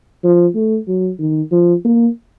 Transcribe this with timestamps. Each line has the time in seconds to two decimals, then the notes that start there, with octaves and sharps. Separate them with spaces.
0.24 F3
0.55 A3
0.88 F#3
1.19 D#3
1.52 F3
1.85 A#3